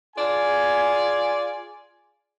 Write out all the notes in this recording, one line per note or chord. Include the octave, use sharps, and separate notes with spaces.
F4 G#4 D5 G#5